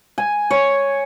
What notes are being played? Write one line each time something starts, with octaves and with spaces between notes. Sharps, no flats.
G#5
C#5